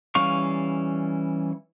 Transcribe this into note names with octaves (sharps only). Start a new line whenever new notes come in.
E3 G3 C#4 F5 C#6